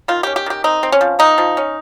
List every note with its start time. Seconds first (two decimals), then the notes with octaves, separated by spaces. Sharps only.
0.08 D#3 F4
0.23 C#4 G4
0.36 G4
0.46 D#3 G4
0.64 C4 D#4
0.83 C4
0.92 C#4
1.01 F3
1.19 A#3 D#4
1.38 F3
1.57 C#4